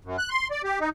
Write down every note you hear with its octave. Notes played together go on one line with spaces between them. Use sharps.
F#2
F#6
C6
D5
G4
D#4